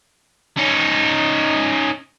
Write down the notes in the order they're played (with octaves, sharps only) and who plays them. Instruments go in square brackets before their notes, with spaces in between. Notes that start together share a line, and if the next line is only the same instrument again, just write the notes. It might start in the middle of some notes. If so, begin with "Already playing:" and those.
[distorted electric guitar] C#4 D#4